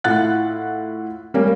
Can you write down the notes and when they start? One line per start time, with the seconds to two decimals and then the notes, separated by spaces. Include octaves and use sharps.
0.04 A2 E4 F4 F#5 F#6 A6
1.34 G3 A#3 C#4